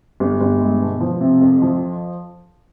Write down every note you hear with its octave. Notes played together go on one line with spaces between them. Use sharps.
G1
G1
G#3
B2
F3
C3
F2
F3